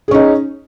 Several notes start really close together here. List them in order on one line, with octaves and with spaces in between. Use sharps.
G#4 C#4 D#4